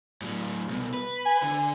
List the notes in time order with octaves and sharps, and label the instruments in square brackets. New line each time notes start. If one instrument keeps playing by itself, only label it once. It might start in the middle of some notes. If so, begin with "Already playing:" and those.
[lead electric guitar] A2 F#3
C2 B2
B4
[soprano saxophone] G#5
[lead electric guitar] D3